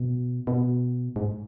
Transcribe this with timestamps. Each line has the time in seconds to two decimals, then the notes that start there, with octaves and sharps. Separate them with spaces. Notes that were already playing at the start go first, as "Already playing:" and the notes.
Already playing: B2
0.47 B2
1.16 G#2